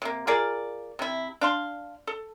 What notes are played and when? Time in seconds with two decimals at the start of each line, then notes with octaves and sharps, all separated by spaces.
0.02 C3 A#3
0.27 F4 G#4 A#4 D5
0.99 C3 E4
1.41 D4 F5 C6
2.07 A4